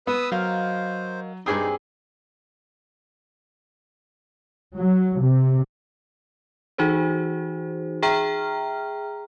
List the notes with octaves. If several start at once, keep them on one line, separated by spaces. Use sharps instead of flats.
B3 B4 D#6 E6
F#3 A#4 C5 D#5 F5
G2 C4 D#4 G#4 D5 G#5 D#6
F#3
C3
E3 D#4 F#4 G#4 C5
G#4 E5 G5 A#5 F6